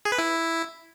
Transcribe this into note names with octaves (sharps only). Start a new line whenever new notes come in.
G#4
B4
E4